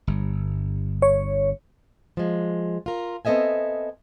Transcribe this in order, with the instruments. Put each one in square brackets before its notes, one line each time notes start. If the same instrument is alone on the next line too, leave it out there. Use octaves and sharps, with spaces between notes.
[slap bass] G1 G2
[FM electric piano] C#5
[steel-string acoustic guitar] F3 G#3
F4 A#4
B3 C4 A4 D#5 E5 G#5